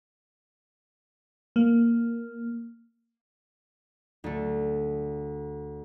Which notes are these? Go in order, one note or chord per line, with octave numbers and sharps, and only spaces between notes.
A#3
D2 A3